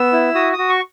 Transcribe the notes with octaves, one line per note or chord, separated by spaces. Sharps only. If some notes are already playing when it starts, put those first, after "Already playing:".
Already playing: B3 E6
E4
F#4 D#6
D#6
F#4
C#6